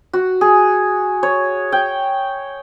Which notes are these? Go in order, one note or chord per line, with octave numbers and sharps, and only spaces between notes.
F#4
G#4
C#5
G5